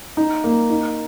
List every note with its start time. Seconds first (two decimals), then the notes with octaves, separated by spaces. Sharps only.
0.17 D#4
0.44 A#3
0.70 D#4